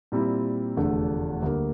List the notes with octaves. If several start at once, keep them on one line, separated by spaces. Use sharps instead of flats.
A#2 G3 C4 E4
F1 E2 D3 A3 D4
D2 D3 G3 A#3